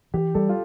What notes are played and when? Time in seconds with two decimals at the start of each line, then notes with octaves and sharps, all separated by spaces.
0.14 E3 G4
0.35 G3 A4
0.49 F4